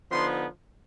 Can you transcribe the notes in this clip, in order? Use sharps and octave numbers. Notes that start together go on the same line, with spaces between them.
D3 F3 B3 D#4 C6